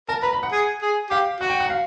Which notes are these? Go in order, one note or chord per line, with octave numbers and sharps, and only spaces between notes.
A#4 A5
B4 A#5
B5
F#5
G#4
G#4
G4 F5
F#4 F#5
G5
F#5
F5